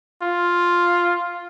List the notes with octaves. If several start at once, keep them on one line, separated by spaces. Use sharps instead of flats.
F4